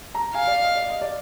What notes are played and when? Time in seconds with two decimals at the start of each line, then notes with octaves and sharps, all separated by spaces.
0.15 A#5
0.34 F5 G#5
0.47 D5
0.62 D#5
0.75 D5
0.89 D#5
1.01 D5